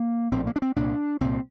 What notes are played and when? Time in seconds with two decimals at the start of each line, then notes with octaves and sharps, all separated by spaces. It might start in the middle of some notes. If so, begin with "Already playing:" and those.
Already playing: A#3
0.32 A#1 A2 C4
0.47 A#3
0.56 D4
0.62 C4
0.76 C2 A#2 D4
1.21 C2 A#2 C4